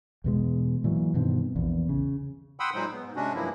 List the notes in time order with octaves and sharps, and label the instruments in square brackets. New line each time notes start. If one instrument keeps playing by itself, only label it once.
[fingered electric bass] E2 B2 G#3
A#2 E3 F#3
G2 B2 D#3 C4
A#1 E2
C#3
[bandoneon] F#5 G5 B5 C6 D#6 E6
A#2 F#3 G#3 D#4 C5
B3
G#2
C3 G#3 C#4 D4 F#4
G2 F3 F#3 A#3 E4